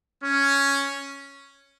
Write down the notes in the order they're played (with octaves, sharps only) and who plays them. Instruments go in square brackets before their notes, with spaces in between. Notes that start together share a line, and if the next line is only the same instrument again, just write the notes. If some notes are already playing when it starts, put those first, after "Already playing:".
[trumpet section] C#4